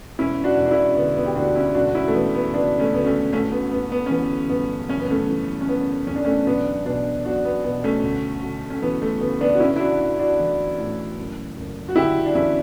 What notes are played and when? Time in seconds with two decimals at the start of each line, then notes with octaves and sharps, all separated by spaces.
0.18 E1 C#4 E4
0.44 D4 F#4
0.57 E1
0.65 D4
0.71 C#4 E4
0.97 D3 B3
1.17 B3
1.26 G4
1.36 D2 D4 F#4
1.55 C#4 E4
1.75 E1 D4 F#4
1.87 F#4
1.95 C#4 E4
2.08 A3
2.14 E3 B3
2.35 B3
2.54 C#3 B3 D4
2.80 A3 C#4
2.94 D2 B3
3.06 A3 C#4
3.33 A1 A3 C#4
3.52 B3
3.71 A1 B3
3.92 B3
4.06 C#4
4.10 E3 B3
4.50 G2 B3
4.89 F#1 C#4
5.00 B3
5.10 A3 C#4
5.29 E3
5.61 C#4
5.67 C#3 B3
6.07 E2 C#4
6.16 D4
6.25 A3 C#4
6.46 B1 B3 D4
6.85 B2 B3 D4
7.25 B1 D4 F#4
7.45 B3
7.64 B2 B3
7.84 A3 C#4
8.03 D2
8.43 D2
8.70 C#4
8.82 E3 B3
9.02 A3
9.21 C#3 B3
9.41 B3 D4
9.55 F#4
9.60 A1 C#4 E4
9.76 E4
9.80 D4 F#4
10.00 A1
10.19 D4 F#4
10.40 E3
10.78 A2
11.18 F#1
11.56 F#1
11.89 F#4
11.96 D3 E4 G4
12.26 D4
12.35 E2 C#4 E4